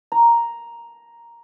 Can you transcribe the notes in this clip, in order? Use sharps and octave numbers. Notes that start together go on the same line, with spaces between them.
A#5